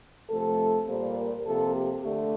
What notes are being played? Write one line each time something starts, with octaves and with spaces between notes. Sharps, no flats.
C3 F3 A3 A4
A#2 G3 A#3 C5
A#4
C3 F3 A#3 A4
G4
D3 A3 A4